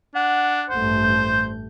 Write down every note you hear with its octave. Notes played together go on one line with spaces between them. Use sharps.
D4 F#5
A1 G2 A3 C5
G6